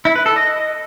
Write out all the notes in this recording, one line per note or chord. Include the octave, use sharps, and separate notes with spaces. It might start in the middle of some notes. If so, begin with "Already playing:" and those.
E4
B4
A4
D#5